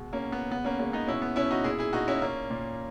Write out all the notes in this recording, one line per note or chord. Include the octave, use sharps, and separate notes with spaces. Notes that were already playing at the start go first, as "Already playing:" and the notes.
Already playing: B2 G#3
A#3 C#4
B2
B3
C#3 B3
A#3 C#4
G#3 A#3 C#4
B3 D#4
B2 C#4 E4
B3
B2 C#4 E4
D#4 F#4
A#2 E4 G#4
E4 G#4
A#2 D#4 F#4
C#4 E4
A#2 A#3 C#4
A#2